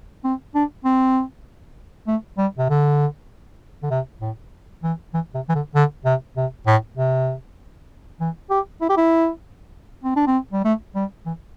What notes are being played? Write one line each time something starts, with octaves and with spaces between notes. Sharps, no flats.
C4
D4
C4
A3
G3
C3
D3
D3
C3
A2
E3
E3
C3
E3
D3
D3
C3
C3
A2
C3
E3
G4
E4
G4
E4
C4
D4
C4
G3
A3
G3
E3